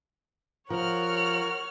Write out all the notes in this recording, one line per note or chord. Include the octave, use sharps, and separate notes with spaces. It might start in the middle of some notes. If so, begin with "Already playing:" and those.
F3 A#4 C#5 F#5 F6